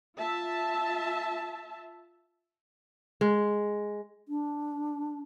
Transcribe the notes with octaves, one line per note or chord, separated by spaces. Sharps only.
F4 E5 A5
G#3
D4